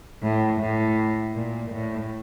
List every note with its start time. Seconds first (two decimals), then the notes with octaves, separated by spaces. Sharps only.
0.23 A2
0.61 A2
1.35 A#2
1.71 A2